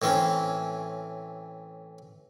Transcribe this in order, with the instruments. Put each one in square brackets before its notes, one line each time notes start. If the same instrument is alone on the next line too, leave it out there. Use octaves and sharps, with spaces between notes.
[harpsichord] A2 E3 C4 C#4